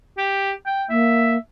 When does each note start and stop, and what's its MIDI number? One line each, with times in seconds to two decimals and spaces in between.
0.18 0.51 67
0.66 0.83 79
0.89 1.37 58
0.89 1.36 76